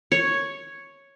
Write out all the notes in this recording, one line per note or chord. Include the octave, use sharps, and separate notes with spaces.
C#5